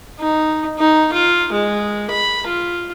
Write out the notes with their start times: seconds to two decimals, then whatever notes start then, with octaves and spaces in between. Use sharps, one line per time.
0.19 D#4
0.79 D#4
1.13 F4
1.52 G#3
2.11 B5
2.47 F4